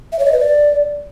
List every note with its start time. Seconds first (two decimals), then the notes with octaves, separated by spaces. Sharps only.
0.12 E5
0.19 C#5
0.26 D#5
0.33 B4
0.40 D5